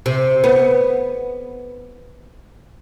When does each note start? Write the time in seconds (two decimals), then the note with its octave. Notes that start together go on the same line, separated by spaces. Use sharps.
0.06 C3
0.44 B3